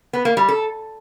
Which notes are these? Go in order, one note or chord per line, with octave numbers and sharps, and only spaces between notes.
B3
A#3
G3
A4